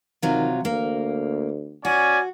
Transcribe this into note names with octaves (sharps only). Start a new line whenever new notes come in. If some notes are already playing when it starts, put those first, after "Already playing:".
C3 D#3 F#3 F4
D2 A#3
C#4 F#4 D5 G#5